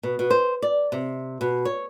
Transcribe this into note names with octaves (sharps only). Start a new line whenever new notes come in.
B2
B2
C5
D5
C3
B2
C#5